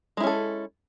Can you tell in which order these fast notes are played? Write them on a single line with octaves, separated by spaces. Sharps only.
G#3 E4 C#4 A4